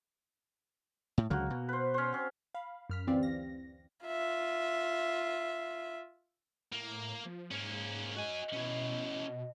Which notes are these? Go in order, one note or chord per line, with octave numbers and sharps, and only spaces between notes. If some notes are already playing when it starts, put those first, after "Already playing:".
A2
C#2 D3 F#3 A#3 F#4
B2
B4 C5
C#4 C5
C4 C#4
F5 B5
F#2 F6 B6
D2 E3 C4 G4 D5 F5
A#6
F4 E5
A2 A#3
F3
G#2 A#3 C#4
F#4 D#5 G#5
B2 C#4 E4